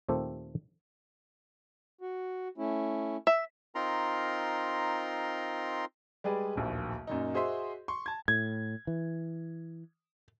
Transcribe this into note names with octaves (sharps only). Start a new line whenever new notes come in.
D#2 A#2 A3 C4 G4 A4
F#4
A3 C#4 E4
E5
C4 D#4 F4 A#4 A#5 C6
G3 G#3 G4 G#4 B4 D5
D1 A#1 D#2
F#2 A#2 D#4
F#4 G#4 C5 D#5 E5 C6
C6 C#6
A5 G#6
A2 G#6
E3